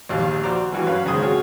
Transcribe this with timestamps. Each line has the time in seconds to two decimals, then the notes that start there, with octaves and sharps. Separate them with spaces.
0.09 A#1 D#2 F5
0.44 F#4 C5 D5 A#5
0.72 G2 E3 F#4
0.87 F#2 C#4 B4 F5
1.06 C#2 D#3 G#4 C5 G#5 D#6
1.22 C4 F4 F#4 G#4 C#5